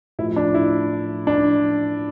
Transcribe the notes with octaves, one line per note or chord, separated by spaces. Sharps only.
A2 F3 E4
D4
E4
D4